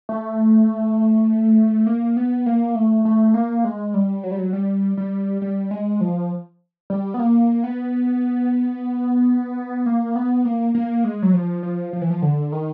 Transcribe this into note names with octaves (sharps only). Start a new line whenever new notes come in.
A3
A#3
B3
A#3
A3
A3
A#3
G#3
G3
F#3
G3
F#3
G3
G3
G3
G#3
F3
G3
B3
A#3
B3
A#3
B3
A#3
A#3
G#3
F#3
F3
F3
F3
E3
F3
D3
D#3